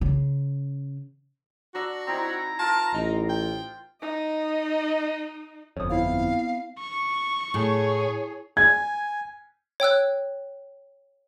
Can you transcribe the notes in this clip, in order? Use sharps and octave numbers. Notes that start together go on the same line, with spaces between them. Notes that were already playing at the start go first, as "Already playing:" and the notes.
C#3
D4 F#4 A#5 E6
C4 D#4 E4 A#5
F4 A#4 A5
A1 D#4
G5
D#4 D#5
G1 F2 C#5 D#6
B3 C4 E4 F5
C#6
A2 G#4 C#5
G#5 G#6
C#5 G5 E6 F#6